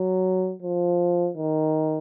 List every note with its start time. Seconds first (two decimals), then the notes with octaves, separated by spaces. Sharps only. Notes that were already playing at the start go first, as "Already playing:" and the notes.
Already playing: F#3
0.62 F3
1.37 D#3